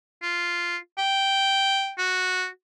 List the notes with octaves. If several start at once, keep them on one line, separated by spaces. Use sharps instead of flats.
F4
G5
F#4